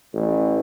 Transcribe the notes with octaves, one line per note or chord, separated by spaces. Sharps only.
A1